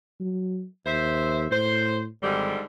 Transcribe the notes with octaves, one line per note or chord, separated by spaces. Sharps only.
F#3
D#2 C5 E5
A2 C5
G#1 G#2 D3 G3